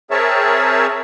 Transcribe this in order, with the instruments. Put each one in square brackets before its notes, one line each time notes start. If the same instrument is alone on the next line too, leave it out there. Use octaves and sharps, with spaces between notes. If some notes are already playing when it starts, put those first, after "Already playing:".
[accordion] C4 G#4 A#4 C#5 E5 A5